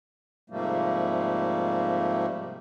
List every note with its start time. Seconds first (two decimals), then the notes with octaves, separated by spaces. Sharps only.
0.50 G#2 C3 F3 G3 A3 A#3